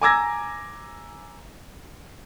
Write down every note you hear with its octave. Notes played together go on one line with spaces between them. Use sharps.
G#5 A#5 D6 E6 G#6 A#6